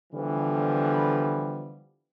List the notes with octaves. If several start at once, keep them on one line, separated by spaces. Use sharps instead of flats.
D3 E3 F3 G3 B3